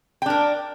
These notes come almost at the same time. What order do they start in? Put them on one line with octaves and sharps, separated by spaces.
G5 D4 A#4